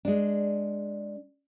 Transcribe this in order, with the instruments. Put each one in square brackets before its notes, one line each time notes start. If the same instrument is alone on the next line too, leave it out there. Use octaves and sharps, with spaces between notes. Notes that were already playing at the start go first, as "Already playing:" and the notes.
[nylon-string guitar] G#3 D4